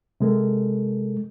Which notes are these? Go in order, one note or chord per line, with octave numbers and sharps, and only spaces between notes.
C3 G#3 A4 A#4